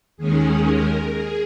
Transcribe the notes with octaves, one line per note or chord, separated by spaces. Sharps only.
D#2 D#3 G#3 C#4 G#4
A#4
G#4